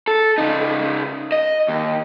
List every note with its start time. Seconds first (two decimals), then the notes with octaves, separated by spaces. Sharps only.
0.08 A4
0.38 C#3 D#4
1.32 D#5
1.68 D#2